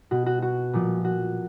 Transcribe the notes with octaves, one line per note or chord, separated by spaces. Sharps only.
B2 F#4
F#4
F#4
A#2 F3
F#4